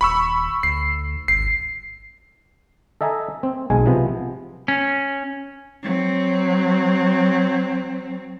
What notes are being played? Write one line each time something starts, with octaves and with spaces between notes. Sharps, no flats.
D#1 B5 C#6 E6
D2 C7
G#1 C7
A4 D#5 E5 G#5 A#5
C4
B1 G#3 G#5
C3 F3 B3
C#4
F#3 C4